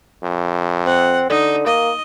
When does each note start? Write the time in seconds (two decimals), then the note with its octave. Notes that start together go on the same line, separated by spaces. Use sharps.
0.23 F2
0.86 C4 F#5
1.30 D3 D#4
1.66 A#3 D#5